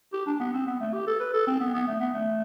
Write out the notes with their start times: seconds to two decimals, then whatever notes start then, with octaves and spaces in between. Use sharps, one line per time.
0.13 G4
0.26 D4
0.40 B3
0.53 C4
0.67 B3
0.80 A3
0.93 G4
1.07 A4
1.20 B4
1.34 A4
1.47 C4
1.60 B3
1.74 B3
1.87 A3
2.00 B3
2.14 A3